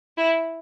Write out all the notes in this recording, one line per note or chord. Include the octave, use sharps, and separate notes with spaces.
E4